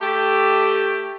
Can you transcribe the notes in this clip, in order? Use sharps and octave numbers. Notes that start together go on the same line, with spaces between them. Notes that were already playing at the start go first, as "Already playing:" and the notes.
A3 G4